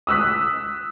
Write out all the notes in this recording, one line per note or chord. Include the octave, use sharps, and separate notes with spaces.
D#6 E6 F#6 B6